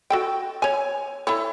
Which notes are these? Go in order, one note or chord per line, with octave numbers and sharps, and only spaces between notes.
F#4 A4 G5
C#5 G#5
E4 A4 C#5